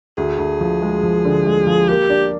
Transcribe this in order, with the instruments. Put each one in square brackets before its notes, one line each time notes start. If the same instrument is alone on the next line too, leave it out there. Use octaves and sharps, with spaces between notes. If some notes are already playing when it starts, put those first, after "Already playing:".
[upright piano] D2 [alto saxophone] G#4
[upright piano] D2
F3
G#3
F3
D3
G#3
F3
[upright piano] A#3 [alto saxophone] G4
[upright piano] D4